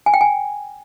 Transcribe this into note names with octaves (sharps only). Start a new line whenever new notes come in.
G#5
G5
G#5